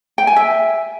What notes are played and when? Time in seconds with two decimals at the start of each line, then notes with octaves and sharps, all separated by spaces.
0.18 G5
0.27 G#5
0.36 E5